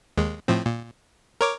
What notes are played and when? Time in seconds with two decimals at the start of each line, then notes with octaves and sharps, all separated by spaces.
0.17 D#2 G#3
0.48 A2 F3 C4
0.66 A#2
1.41 A#4 C#5 D6